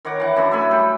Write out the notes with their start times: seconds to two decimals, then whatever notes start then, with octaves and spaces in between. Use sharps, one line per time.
0.05 D#3 C#5 F#5 D6
0.20 E3 F#5
0.36 F#2 D4 B4
0.51 A3 E5 G#5 B5
0.71 G3 G5